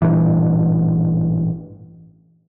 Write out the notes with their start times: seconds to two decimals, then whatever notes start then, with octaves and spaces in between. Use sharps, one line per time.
0.02 A1 G2 A#2 E3